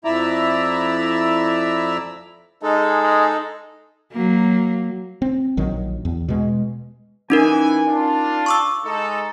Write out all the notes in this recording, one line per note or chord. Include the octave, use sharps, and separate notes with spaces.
F2 E4 D5 E5 A#5
G#3 D#4 A4
G#3
F#3 A#3
C4
A#1 D#3 F#3
E2
B2 G#3
E3 C#4 D#4 A#4 G#5
D4 F4
C#6 D6 E6
G#3 D#4 A4